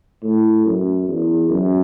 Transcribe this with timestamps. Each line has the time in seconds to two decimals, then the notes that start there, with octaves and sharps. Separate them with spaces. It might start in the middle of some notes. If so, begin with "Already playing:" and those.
0.24 A2
0.66 F#2
1.07 E2
1.50 F#2